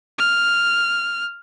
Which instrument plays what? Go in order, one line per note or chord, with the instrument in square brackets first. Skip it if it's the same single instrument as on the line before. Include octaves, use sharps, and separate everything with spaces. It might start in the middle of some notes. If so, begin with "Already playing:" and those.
[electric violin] F6